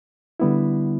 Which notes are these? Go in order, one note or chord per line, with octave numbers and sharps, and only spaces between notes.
D3 G3 B3 E4